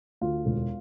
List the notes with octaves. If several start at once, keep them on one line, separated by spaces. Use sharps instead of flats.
D2 F4
E1